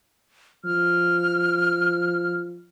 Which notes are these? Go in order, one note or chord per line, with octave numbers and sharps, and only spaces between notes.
F3 F6